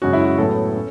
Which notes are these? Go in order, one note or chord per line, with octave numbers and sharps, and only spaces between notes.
F#2 C#3 G#3 C#4 F#4
E4
F#4
A2 F#3 B3 A4
C#4